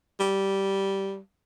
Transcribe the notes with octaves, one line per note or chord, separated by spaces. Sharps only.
G3